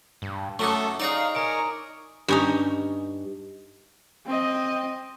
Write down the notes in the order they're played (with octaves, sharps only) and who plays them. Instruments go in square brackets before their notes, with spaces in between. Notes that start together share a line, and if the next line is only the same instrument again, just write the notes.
[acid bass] G2
[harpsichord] F#3 C#4 D#4 [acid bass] A3 [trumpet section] A4 [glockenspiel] C#6 D6
[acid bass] D#4 [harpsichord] G#4 C#5 D5 [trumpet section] F5
[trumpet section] A#4 G#5 C#6 [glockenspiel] A#5 D#6 D7
[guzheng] G2 C#4 D#4
[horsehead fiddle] C4 D#5